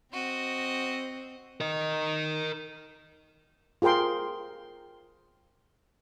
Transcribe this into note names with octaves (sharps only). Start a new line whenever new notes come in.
C4 F#4 D#5
A#4 D#5
F4 G#4 A#4 G5 C6